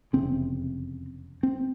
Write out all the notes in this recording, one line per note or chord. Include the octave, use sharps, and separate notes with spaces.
F1 E2 C#3 C4
C4